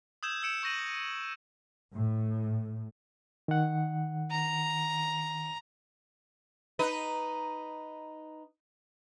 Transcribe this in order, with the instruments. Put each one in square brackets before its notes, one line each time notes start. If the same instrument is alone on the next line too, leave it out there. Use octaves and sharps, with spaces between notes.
[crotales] D#6 E6 G6 G#6 E7
E6 G6 C#7 D7 E7
C#6 G6 A#6 D#7 F#7
[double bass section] A2
[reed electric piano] D#3 F#5
[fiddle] A#5
[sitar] D#4 B4